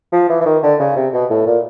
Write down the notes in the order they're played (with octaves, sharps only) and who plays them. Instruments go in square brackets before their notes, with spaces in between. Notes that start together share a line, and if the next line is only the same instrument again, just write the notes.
[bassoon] F3
E3
E3
D#3
D3
C#3
C3
B2
A2
A#2